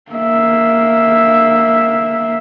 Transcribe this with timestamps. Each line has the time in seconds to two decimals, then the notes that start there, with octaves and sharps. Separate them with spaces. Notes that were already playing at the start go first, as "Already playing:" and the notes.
0.12 A#3 E5